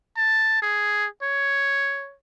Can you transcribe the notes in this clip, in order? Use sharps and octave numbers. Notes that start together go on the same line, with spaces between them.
A5
G#4
C#5